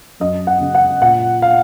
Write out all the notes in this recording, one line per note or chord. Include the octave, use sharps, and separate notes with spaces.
F#2 D#5
F#5
C#3
F#5
A#2 F#5
F5